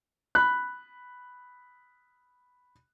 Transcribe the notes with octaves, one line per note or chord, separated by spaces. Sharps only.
B5 F#6